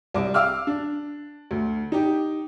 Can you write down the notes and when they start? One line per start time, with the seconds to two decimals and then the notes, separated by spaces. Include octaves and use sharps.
0.14 C2 D6
0.34 F5 D6 E6 F6
0.67 D4
1.51 D2
1.92 D#4 G4